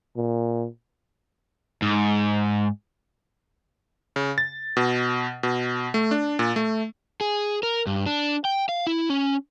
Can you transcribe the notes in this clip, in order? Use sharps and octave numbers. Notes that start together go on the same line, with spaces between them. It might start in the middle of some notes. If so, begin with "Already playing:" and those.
A#2
G#2
C#3
A6
B2
B2
A3
D4
A#2
A3
G#4
A#4
G2
D4
G5
F5
E4
C#4